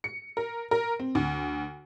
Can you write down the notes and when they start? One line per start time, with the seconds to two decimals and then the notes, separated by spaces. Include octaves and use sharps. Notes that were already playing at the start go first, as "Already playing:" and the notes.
0.04 C#7
0.37 A#4
0.71 A#4
1.00 C4
1.15 D2